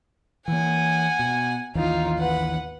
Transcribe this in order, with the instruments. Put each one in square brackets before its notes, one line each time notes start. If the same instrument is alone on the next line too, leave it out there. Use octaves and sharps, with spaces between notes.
[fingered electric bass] E3 A#3 [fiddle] F#5 G#5
[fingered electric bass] B2
[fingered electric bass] G#1 D#2 E3 [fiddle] D#4 F4
[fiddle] B4 F#5